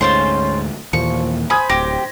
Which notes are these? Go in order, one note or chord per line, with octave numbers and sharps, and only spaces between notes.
D2 G#2 C#4 F4 C5 C6
D#2 A#2 E3 F3 C#6
C5 G#5 B5 D#6 G#6
D1 G4 A#6